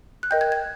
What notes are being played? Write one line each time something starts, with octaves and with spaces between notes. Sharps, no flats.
F#6
A#4 D#5 G5 G6
G#6
G#6